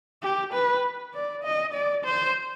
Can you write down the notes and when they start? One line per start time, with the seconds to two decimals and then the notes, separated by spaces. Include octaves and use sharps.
0.22 G4
0.53 B4
1.14 D5
1.44 D#5
1.74 D5
2.05 C5